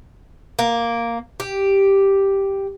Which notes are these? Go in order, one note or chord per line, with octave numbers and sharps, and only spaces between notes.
A#3
G4